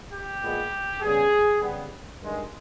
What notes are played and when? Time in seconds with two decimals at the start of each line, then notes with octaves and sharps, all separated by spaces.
0.12 G4
0.42 A#2 G#3 B3
1.02 C#3 G3 B3 G#4
1.62 C#3 G3 B3
2.21 G2 D#3 G#3